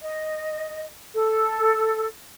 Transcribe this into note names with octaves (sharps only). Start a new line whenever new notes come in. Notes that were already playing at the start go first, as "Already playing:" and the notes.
D#5
A4